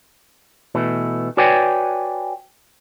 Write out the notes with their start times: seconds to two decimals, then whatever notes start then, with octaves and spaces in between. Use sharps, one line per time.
0.75 B2 E3 A3
1.37 F#4 B4 C#5 D5 G5 G#5